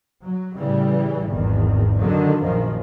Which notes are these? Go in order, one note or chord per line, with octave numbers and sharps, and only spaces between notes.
F#3
A2 C#3 E3 G3
G#1 E2 D#3
F#2 D3 D#3 F#3
A#1 F#2 D#3 F3